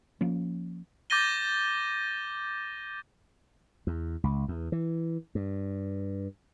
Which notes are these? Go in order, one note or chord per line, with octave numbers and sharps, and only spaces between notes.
F3 A#3 C#4
D6 G6 A6 A#6 D#7 G7
E2
C#2
E2
E3
G2